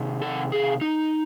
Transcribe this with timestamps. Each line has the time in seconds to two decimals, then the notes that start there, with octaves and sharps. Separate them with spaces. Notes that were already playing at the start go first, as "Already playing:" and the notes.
Already playing: C3 D#3
0.22 A4
0.52 G#4
0.81 D#4